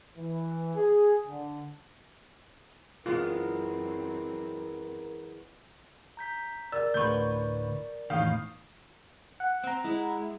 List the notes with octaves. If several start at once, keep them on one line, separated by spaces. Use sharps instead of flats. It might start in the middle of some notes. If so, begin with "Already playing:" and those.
E3
G#4
D3
F#2 E3 F#3 G#3 B3 C4 F4 A#4
A#5 G6 B6
A#4 D5 E6
D2 A2 B4 C#6 G6
E2 A2 D#3 F5 D#6 G6
F#5
C4 F#5 A#5
G#3 E4